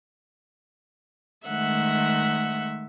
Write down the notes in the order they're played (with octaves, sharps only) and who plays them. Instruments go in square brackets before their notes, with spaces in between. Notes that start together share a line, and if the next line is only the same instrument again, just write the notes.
[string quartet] D#3 G#3 A3 E5 F#5 F#6